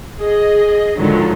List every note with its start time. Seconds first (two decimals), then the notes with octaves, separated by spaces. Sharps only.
0.19 G#4 D#5
0.98 G#2 D3 D#3 F3 F#3